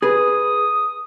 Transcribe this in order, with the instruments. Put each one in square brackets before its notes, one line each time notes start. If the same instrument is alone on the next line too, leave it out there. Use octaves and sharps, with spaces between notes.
[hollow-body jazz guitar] G#4 B4 [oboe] D#6